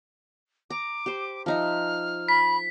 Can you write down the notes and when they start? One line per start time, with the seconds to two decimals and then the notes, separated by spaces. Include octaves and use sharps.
0.70 A#5 D6
1.06 G4 C5
1.46 F3 D#4 E5 F6
2.28 B5 B6